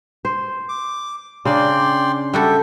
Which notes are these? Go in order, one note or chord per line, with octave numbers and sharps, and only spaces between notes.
C5
D6
C#3 D4 D5 G5 C6
G3 F#4 A4 E5 G5